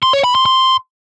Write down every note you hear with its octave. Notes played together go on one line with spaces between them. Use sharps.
C6
C#5
B5
C6
C6